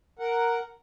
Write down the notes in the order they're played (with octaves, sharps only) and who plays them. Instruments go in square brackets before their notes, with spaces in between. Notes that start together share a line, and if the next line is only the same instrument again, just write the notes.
[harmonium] A#4 F#5